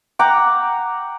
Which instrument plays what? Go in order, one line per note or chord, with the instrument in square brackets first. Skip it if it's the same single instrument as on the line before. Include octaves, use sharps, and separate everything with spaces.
[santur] F#5 G5 A#5 D6